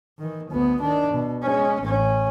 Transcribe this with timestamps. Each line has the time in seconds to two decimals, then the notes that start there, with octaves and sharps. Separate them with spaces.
0.19 D#3 E3
0.50 D2 B3
0.81 D#3 D4
1.13 B2
1.42 G#3 C#4
1.81 A1 C#4